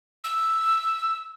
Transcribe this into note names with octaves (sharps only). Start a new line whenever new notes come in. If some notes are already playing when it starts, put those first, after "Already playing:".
E6